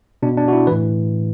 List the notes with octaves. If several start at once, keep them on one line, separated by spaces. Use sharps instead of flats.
B2 D4
D4
F#4
E4
A2 E3 B4